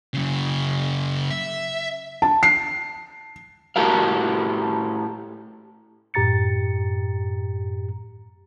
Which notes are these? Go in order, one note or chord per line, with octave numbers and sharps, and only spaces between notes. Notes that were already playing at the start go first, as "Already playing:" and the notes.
F#2 C#3
E5
A5
C7
A2 F#4 G4 A4 A#4 F5
F#2 A2 G4 A#5 A6 C#7